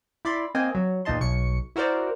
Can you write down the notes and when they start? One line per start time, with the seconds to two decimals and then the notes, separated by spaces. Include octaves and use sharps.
0.25 E4 D5 B5 C6
0.55 A#3 C4 D#5 G#5
0.75 F#3
1.05 E2 A#2 D#4 D#5 A5 C6
1.20 B1 C#6 C#7
1.76 E4 F#4 A#4 C5 D5